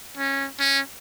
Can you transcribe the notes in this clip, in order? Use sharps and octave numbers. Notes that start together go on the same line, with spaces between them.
C#4
C#4